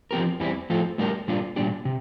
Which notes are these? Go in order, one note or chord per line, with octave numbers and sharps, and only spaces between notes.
F3 C4 G4 A#4
E2 E3 G3 C4 E4
A2 F3 C4 F4 A4
A2 G3 D4 G4 A#4
A#2 G3 D4 F4
A#2 G3 D4 G4
C3